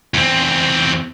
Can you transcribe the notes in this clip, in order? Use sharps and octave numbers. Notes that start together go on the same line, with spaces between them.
E2 C4